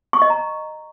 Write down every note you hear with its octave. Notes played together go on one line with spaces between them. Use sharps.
C#6
D#5
A#5